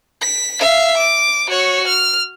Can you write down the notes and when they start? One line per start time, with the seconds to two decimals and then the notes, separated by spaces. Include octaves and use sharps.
0.22 B6
0.60 E5 F5
0.97 D6
1.50 F#4 C#5
1.87 F6